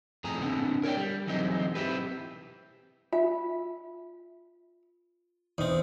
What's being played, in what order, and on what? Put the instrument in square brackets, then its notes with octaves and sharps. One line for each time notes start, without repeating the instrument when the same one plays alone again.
[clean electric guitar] F2 A2 G#4 A#5
D3 B3 C4 D4
A#4 C#5 D5 G5
G3
E3 F#3 G#3 C4 D#4
C4 E4 G4 B4
[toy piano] F4 [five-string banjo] E5
[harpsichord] E2 C4 [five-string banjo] D#4